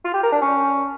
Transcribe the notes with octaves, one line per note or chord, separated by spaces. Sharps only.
F4
G4
A#4
D4
C#4